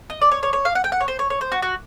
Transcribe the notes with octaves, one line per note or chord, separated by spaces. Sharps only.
D#5
D5
C#5
C#5
C#5
F5
F#5
G5
F#5
C#5
C5
C#5
C#5
C5
F#4
F#4